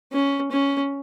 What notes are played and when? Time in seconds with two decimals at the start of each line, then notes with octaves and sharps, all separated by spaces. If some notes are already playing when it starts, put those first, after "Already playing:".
0.13 C#4
0.52 C#4